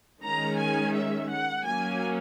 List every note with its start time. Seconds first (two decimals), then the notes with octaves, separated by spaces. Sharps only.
0.22 D#3 G#3 C#4 A#5
0.58 G#5
0.93 E5
1.29 F#5
1.64 F#3 A#3 C#4 G#5